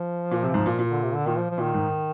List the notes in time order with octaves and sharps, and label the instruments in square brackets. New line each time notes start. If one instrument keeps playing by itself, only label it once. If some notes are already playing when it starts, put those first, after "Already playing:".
Already playing: [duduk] F3
[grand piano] A#2
C3
G#2
A#2
A#2
[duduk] D3
C3
D3
[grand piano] A#2 [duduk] D#3
[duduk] F3
F3
[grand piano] A#2 [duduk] D#3
[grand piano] G#2